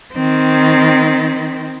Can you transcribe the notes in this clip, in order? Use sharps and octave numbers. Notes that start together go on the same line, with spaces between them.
D#3 C4